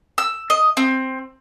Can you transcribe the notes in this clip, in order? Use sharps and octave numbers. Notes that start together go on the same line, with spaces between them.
E6
D#5
C4